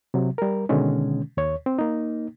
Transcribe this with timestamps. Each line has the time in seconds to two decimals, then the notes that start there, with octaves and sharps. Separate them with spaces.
0.14 C3 F#3
0.38 G3 A#4
0.69 B2 D3 D#3 G#3 C#4
1.37 D#2 C#5
1.66 C4
1.79 A#3 D#4